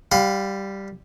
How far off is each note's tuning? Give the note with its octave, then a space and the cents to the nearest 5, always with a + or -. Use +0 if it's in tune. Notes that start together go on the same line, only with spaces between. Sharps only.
G3 +0 F5 +25 B5 +40